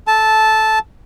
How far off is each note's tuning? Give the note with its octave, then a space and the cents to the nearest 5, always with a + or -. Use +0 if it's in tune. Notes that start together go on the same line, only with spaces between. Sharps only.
A4 -15 A5 -10